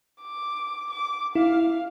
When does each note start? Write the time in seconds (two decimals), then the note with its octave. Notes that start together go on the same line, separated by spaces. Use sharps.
0.22 D6
0.91 D6
1.35 E4 F5